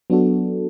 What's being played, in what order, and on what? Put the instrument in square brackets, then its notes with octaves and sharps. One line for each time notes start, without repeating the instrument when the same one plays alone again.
[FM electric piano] F#3 B3 D4 F#4 A4